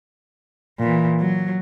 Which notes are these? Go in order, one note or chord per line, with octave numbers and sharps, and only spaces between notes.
A#2 E3
F#3